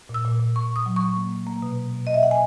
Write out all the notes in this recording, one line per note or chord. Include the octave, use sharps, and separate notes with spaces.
A#2
E6
A#2
A#2
A#2 C#6
A#2
D#6
F#3
C#6
A#2
A#3
A#3
A#3
B2
B2
B2
B2 D#5
E5
B2 F#5
G#5